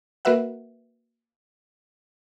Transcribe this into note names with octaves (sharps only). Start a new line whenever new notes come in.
A#3 F#4 A#4 B4 E5 F#5